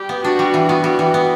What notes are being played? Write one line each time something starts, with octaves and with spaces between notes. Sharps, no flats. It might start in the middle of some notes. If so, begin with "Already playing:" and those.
Already playing: G3 G4
B3
D4 F#4
G3
E3
B3 F#4
G3
E3
B3